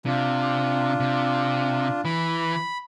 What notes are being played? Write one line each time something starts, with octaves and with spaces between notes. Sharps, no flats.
C3 D4 F4
C3
E3 B5